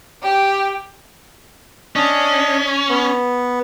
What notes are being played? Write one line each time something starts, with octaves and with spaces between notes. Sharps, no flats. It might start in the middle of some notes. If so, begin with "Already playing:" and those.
G4
C#4 D4 D#5
B3